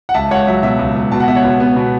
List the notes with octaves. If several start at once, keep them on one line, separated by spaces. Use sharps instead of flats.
F#5
C#2 E5 A5
C#2 C#5 F#5
F#3 E5
B2 E5
C#2
C#2
B2 A5
F#5
B3 E5
C#5 F#5
B2
B3
B2